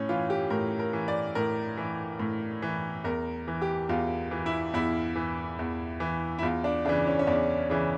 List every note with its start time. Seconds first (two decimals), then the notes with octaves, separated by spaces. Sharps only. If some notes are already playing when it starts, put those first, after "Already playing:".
Already playing: A2 C#4
0.09 E3 F4
0.30 G4
0.50 A2 A#4
0.79 A#4
0.93 E3
1.08 D5
1.35 A2 A#4
1.77 E3
2.20 A2
2.62 E3
3.04 E2 A#4
3.48 E3
3.62 G4
3.89 E2 F4
4.31 E3
4.46 E4
4.74 E2 E4
5.16 E3
5.59 E2
6.00 E3
6.39 E4
6.42 E2 F4
6.64 D4
6.85 C#3 E3 D4
7.07 C#4
7.19 C#4
7.27 E2 D4
7.70 C#3 E3